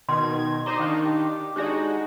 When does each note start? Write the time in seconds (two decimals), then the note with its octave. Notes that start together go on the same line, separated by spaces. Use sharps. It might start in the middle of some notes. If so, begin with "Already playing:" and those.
0.09 B2 D#3 C6 G#6
0.66 D#4 F#4 C5 D5 D#5 A#5 C6 D#6
0.79 D#3 D4 D#4 F5 C#6
1.04 G4
1.56 G#3 D4 D#4 F#4 G4 D5